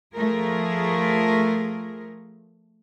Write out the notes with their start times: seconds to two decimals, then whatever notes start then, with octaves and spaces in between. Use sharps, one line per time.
0.13 F3 A3 F4 G#4 A#4